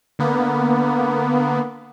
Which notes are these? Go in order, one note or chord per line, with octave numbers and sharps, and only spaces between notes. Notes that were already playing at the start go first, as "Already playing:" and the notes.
D3 A#3 B3